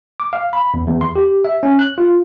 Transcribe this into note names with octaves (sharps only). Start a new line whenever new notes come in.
D6
F5
B5
E2
E2
C6
G4
E5
C#4
F#6
F4